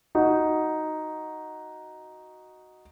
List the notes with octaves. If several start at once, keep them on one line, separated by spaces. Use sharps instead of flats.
D#4 F#4